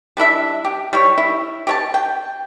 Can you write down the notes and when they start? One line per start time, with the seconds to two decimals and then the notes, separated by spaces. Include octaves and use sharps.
0.17 G3 D4 E4 E5
0.65 G4
0.93 G3 E4 C#5
1.18 E4
1.67 G4 C#5 A5
1.94 G5